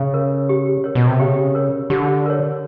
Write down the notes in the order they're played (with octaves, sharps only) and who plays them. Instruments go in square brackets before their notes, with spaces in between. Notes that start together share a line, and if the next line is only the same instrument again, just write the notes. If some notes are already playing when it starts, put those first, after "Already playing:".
Already playing: [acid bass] C#3
[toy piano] A#4 C#5
G4
A#4 C#5
[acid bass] B2
C3
[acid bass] C#3 [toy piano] G4
[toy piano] A#4 C#5
[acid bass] D3 [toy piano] G4
[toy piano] A#4 C#5